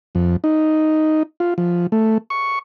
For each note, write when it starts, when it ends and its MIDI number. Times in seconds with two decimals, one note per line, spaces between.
0.15 0.36 41
0.44 1.23 63
1.40 1.54 65
1.58 1.87 53
1.92 2.18 57
2.30 2.59 85